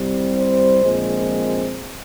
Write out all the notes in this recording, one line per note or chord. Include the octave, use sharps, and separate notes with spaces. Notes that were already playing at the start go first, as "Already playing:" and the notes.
Already playing: C2 C3 G3 C4
C5
A#1 A#2 G#3 C4